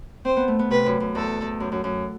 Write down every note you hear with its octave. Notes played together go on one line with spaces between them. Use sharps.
C4 C5
B3
A3
B3
C3 B4
F#2
F#2
E2 A4
E2
F#2
F#2
F#2